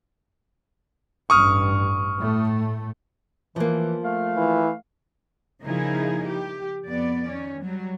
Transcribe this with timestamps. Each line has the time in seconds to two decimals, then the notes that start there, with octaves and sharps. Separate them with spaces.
1.30 A1 G2 C#6 D#6 F6
2.17 A2 A3
3.56 E3 F3 A#3
4.03 A3 F5
4.37 E3
5.63 C#3 F3 A#3 D#4 E4 G#4
6.28 G4
6.87 F2 B3 D5
7.29 D#3 C#4
7.61 F#3 G3